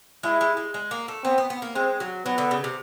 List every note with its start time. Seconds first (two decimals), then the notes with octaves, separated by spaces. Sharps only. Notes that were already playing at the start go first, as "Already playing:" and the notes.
0.23 G#3 E4
0.41 G#3
0.57 G#3
0.74 G#3
0.91 A#3
1.08 A3
1.24 B3 C4
1.38 B3
1.50 B3
1.62 A#3
1.75 G#3 C4
2.00 F#3
2.25 F#3 B3
2.38 D3
2.51 C#3
2.64 C3